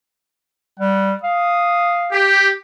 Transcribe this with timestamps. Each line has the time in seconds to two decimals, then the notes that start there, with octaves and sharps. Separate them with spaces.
0.79 G3 F#5
1.23 F5 D#6
2.12 G4